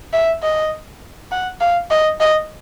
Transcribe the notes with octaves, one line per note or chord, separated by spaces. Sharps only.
E5
D#5
F#5
F5
D#5
D#5